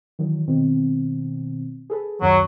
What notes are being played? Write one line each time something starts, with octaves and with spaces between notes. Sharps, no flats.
D#3 E3 F#3
B2 D#3 C4
G#4 A4 B4
C#2 F#2 D#3 F#3